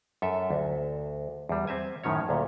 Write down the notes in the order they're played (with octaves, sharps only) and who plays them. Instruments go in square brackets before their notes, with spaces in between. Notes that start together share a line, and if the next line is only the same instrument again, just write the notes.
[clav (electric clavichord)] F#2 A4 E5
D2
E2 G3
C4 E5 G#5
F#2 A2 D#3 C#4 C#5
D2 A#2